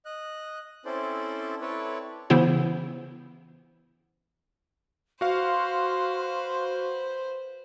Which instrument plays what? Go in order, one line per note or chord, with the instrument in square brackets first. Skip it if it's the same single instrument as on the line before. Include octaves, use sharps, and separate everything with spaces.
[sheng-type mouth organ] D#5 F#6
C4 C#4 E4 A4 C5 D5
C4 E4 A4 B4 C#5 D5
[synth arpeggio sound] C#3 E3 B3 E4 C5
[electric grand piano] F#4 F5 [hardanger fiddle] B4 C5 [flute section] C6